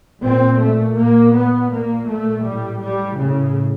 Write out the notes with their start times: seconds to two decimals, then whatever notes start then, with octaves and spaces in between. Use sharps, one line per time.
0.22 A#2 C4
0.59 A3
0.96 A#2 A#3
1.33 B3
1.70 A#2 A#3
2.07 A3
2.44 A2 G3
2.81 G3
3.17 A2 C#3